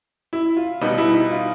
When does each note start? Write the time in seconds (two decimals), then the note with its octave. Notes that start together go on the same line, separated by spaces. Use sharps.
0.33 E4
0.57 F4
0.81 B2 G3 B3 D#4
0.98 E4
1.14 D#4
1.31 F4